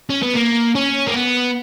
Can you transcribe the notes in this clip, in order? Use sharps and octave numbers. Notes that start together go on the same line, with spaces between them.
C#4
B3
A#3
C#4
A#3
B3